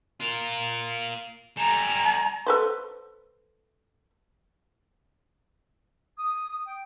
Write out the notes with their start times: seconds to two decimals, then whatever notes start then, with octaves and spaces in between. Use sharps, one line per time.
0.20 F4 A#4
1.57 G3 A4 G#5 A#5
2.46 A4 B4 C5
6.18 D#6
6.66 G5